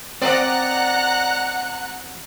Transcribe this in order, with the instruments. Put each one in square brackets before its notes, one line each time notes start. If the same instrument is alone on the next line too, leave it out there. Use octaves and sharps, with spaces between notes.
[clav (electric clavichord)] C4 [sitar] D5 D#5 [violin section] F#5 A#5 F#6